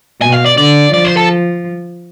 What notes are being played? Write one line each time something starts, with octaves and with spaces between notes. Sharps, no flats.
B2 G#5
F5
D5
D3 D5
F3 D5
C5
A4